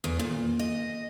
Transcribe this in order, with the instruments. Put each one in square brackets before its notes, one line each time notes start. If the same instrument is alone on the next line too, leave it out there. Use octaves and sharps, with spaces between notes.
[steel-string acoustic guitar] E2
A#2
D#5